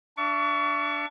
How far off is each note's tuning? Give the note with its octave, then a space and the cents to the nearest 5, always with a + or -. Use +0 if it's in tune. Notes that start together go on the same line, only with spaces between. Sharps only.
D4 +0 E5 +40 C#6 +30